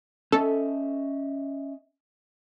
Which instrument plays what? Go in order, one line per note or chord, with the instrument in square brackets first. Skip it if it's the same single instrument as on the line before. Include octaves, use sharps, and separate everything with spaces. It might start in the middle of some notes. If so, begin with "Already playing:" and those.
[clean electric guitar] C#4 D#5 E5 [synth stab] A4